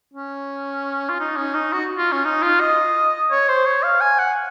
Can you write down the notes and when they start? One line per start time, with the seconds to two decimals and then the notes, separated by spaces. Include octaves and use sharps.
0.13 C#4
1.09 F4
1.20 D#4
1.36 C#4
1.54 D#4
1.73 F#4
1.98 F4
2.12 C#4
2.25 D#4
2.43 F4
2.60 D#5
3.31 C#5
3.48 C5
3.65 C#5
3.83 F5
4.01 G#5
4.19 F#5